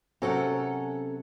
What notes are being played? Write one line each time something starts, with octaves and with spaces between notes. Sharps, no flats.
C3 F#3 C#4 A4 A#4 F#5